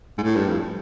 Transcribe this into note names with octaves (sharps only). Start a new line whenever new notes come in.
G#2
A2
G2
F2